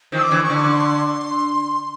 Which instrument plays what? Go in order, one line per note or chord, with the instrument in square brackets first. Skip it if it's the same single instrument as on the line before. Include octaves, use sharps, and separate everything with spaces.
[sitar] D#3 F3
[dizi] E6
D6
[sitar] D3 E3
[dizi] C#6
[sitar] D3
[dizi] C#6
C6